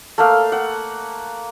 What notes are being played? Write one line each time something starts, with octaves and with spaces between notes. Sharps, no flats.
A3 A#3 F5
F#5